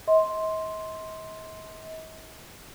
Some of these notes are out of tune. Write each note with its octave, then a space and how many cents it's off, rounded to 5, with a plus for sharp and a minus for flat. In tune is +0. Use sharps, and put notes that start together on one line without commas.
D#5 +45 C6 +0